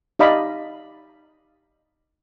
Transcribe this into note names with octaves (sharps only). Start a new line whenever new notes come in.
D#4 G4 D5 D#5 F5 B5